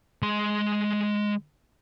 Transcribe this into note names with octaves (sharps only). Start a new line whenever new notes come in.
G#3 C6